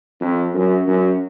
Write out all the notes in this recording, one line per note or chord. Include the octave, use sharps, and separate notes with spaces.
F2
F#2
F#2